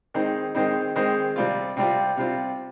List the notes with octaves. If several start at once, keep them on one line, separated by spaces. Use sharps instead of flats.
D#3 G#3 C4 D#4
D#3 G#3 C4 D#4
D#3 G#3 C4 D#4
C3 G3 C4 F4
C3 G3 C4 F4
C3 G3 C4 F4